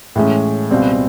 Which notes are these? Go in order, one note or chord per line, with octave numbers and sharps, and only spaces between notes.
A2 E3 G#3 C#4
C#2 B2 G3 C4